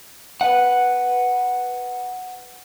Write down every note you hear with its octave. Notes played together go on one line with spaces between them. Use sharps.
B4 F#5